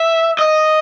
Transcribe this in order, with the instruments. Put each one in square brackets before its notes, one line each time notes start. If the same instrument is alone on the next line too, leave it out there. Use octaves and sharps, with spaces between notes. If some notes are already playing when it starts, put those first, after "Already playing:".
Already playing: [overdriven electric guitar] E5
D#5